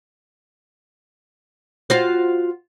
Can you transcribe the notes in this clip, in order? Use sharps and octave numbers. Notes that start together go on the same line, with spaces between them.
F4 F#4 C5